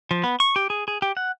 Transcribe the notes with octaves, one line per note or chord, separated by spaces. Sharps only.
F3
B3
C#6
G4
G#4
G#4
G4
F#5